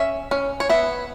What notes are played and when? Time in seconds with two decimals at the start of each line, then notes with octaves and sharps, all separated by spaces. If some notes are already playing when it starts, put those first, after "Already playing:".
Already playing: C#4 E5
0.31 C#4
0.60 C#5
0.69 B3 E5